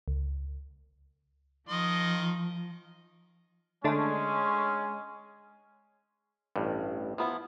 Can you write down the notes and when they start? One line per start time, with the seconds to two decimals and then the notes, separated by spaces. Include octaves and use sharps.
0.08 C#2
1.69 D#3 F3 D#5 C6
3.84 D3 G#3 A3 C#4 D4
6.56 A1 G2
7.18 F3 B3 E4